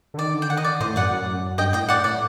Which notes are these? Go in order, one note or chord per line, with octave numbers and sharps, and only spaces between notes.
D3
D#3 D5
D3
G5
D#3 F#5
D#5
D5
A2 C5 D#5
F#2 D5 F#5
F#2
G2 D#5 G5
A2 D#5 G5
A2 D5 F#5
A2 D5